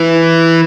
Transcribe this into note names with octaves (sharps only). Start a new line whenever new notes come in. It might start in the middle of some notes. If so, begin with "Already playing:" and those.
Already playing: E3